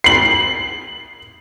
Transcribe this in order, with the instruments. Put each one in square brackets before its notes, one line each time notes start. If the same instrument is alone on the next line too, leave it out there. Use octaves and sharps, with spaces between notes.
[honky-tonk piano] C7 F#7